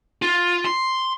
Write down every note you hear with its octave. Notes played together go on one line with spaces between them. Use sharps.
F4
C6